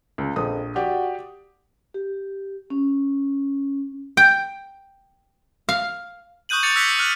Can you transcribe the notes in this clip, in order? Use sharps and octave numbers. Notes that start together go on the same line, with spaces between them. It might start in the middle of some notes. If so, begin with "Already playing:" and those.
C#2
A#1 F2 D#6
F#4 G4 D5
G4
C#4
G5
F5
C#6 D#6 F#6 G6 D#7 F#7
D6 A6 C#7 F7
E6 F#6 A#6 B6 C#7
F6 F#6 F#7